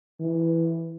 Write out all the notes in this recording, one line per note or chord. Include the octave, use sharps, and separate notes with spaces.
E3